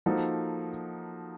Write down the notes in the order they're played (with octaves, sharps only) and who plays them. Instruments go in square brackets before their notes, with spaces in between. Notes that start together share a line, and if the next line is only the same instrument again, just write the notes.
[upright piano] F3 A#3 D#4 F#4 A4